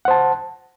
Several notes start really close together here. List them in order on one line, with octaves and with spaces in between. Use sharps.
F#5 C5 A5